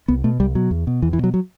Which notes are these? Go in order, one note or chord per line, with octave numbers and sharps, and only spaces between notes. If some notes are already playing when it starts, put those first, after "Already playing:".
C2 B3
B2 A3
C2 G3
B2 F#3
E2
B2
E2 E3
E3
B2
F#3
F#3